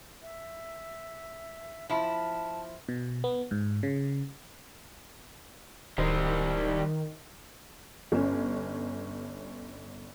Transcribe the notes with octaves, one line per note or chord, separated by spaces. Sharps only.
E5
F3 E4 A5
B2
B3
G#2
C#3
D1 D#3 G3 C5
G1 C#4